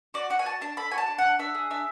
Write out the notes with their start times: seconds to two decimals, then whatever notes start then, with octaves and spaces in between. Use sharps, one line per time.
0.14 F#4 D5
0.30 F#4 F#5
0.39 G#5
0.45 F#4 A5
0.61 D4 A5
0.77 A4 B5
0.91 F#4 G#5
0.98 A5
1.08 D4
1.18 F#5
1.24 D4
1.39 D4 E5
1.55 G#4
1.70 D4 E5